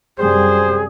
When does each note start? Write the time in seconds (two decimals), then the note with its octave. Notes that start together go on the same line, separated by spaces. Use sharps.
0.18 F#2 C3 G3 G#4 C5